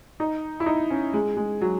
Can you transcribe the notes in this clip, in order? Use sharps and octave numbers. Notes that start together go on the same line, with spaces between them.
D#4
E4
D#4
C#4
G#3
G#3
F#3